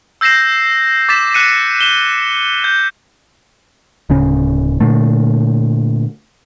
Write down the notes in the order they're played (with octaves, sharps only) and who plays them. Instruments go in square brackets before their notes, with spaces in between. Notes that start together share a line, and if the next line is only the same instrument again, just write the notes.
[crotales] E6 G6 A#6 C7 E7
D6 A6 B6 E7
F#6 C#7 D#7
E7 G7
G6
[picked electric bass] D1 C#3 C#4
A#2 D3 A3